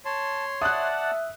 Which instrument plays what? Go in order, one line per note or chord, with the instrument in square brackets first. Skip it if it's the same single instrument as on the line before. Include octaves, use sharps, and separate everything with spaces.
[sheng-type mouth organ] C#5 C6 [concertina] A5
[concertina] D5 F#5 A5 [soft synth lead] E5 [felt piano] D#6 F#6